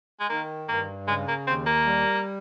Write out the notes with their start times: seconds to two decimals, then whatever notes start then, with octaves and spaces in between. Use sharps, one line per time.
0.20 G#3
0.29 D#3 A#3
0.68 G2 A#3
1.07 C#3 G#3
1.28 A#3
1.47 D#2 C4
1.66 A#3
1.86 G3